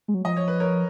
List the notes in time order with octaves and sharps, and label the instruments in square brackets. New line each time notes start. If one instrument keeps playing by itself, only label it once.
[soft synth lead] G#3
F#3
[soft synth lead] F3 [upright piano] D#5
[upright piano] C#5
B4
A#4 C#5